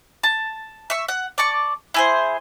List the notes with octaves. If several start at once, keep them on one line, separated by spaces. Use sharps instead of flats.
A5
E5 C#6
F#5
D5 A5 C#6
E4 G#4 C5